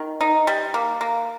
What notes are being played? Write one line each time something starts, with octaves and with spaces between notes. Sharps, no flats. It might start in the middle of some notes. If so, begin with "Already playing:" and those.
Already playing: D#3
D#4
G3
A#3
A#3